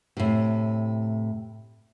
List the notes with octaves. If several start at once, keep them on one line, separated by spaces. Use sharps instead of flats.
A2 C3